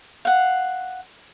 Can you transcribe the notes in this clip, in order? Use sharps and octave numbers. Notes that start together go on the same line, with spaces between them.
F5 F#5